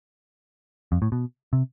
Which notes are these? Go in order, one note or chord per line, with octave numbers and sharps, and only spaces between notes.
F2
A2
B2
C3